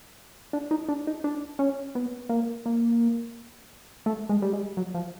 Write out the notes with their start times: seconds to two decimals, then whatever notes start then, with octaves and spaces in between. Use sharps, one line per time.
0.53 D4
0.71 D#4
0.88 D4
1.07 D#4
1.24 D4
1.59 C#4
1.95 B3
2.29 A#3
2.66 A#3
4.06 A3
4.29 G#3
4.42 G3
4.53 G#3
4.77 F#3
4.94 F3